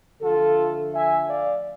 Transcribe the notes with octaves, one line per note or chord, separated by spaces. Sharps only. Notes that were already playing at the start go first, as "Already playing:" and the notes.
D3 F3 A3 F4 A4
E5 G#5
D5 F5